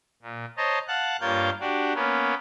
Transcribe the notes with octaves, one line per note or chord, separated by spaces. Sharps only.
A#2
C5 C#5 D#5 A5 A#5
F5 F#5 A5 F#6
G2 A#3 F4 C#5 G6 A6
D4 F#4 G4 D5
A#3 B3 C#4